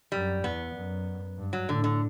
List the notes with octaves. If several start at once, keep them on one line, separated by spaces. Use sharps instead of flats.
F#2 G3
E2 B3
F#2
G2
F#3
A2 D3
D3